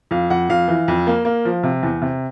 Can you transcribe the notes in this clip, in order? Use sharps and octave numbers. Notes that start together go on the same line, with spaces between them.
F2 F5
F2 F#5
F2 F5
E3
F2
A#3
A#3
F3
C3
E2
C3